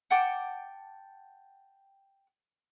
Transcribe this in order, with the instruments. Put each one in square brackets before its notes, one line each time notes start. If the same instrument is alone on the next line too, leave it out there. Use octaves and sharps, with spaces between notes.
[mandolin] F#5 G5 A5 D6